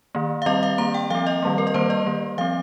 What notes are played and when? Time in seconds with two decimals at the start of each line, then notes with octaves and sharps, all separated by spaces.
0.15 D#3 A#3
0.42 F5
0.46 D#3 G3 C4 D#5
0.63 F5
0.78 D#3 A#3 A#5
0.94 G5
1.10 F3 C4 F5
1.27 D#5
1.43 D#3 G3 A#3
1.58 A#4
1.67 D#5
1.74 D#3 G3 A#3 C5
1.90 D#5
2.06 D#3 A#3
2.38 F3 C4 F5